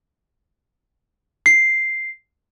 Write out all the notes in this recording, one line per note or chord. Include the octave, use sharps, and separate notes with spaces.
C7